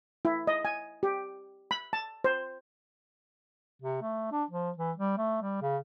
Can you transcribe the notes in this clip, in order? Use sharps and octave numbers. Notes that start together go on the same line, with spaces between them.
E4
D#5
G#5
G4
B5
A5
C5
C3
A3
D4
F3
E3
G3
A3
G3
C#3